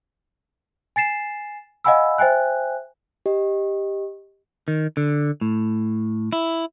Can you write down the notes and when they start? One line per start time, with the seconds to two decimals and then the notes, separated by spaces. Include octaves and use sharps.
0.96 G#5 A6 C7 E7
1.84 D#5 F5 F#5 G#5 B5 E6
2.18 C5 E5 G5 G#5 F#6
3.26 G4 D#5
4.68 D#3
4.97 D3
5.41 A2
6.33 E4